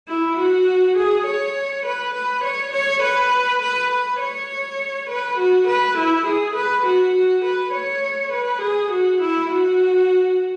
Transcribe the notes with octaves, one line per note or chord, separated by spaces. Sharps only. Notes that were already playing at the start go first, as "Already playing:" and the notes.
E4
F#4
G#4
C#5
B4
B4
C#5
C#5
B4
B4
B4
C#5
B4
F#4
B4
E4
G#4
B4
F#4
F#4
B4
C#5
B4
G#4
F#4
E4
F#4